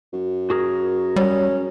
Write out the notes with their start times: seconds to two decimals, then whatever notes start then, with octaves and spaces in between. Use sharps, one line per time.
0.13 F#2
0.50 F#4 G#4 A#4
1.16 G3 C#4